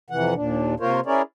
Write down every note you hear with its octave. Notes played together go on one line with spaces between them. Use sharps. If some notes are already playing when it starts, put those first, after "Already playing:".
F2 C3 E3 F#5
D#2 A#2 D4
C3 A#3 F4 A#4 C5 C#5
C#4 E4 G#4 A#4 C#5 D5